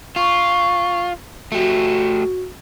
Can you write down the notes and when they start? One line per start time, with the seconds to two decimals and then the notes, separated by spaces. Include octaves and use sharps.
0.16 F4 C#6
1.52 A3 F#4 G4